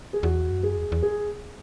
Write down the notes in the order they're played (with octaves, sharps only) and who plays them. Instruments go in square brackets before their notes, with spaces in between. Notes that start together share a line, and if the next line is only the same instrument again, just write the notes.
[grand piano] G#4
[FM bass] E2 [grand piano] F#4
[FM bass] F#2
[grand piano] G#4
[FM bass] E2
E2
[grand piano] G#4